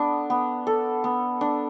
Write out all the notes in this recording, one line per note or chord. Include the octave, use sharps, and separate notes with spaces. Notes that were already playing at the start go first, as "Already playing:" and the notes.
Already playing: B3 D4 A4
B3
A4
B3
D4